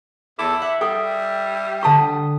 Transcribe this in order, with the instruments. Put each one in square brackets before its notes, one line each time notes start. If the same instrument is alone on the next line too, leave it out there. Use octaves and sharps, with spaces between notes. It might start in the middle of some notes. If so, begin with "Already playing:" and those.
[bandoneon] E2 A4 D6 [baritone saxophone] E4
[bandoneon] E5 [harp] F#5
[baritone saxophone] G3 [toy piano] A4 D#6 [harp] G5
[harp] D3 D#6 B6 [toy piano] F#5 A5 C#6